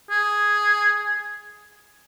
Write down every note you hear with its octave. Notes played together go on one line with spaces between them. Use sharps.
G#4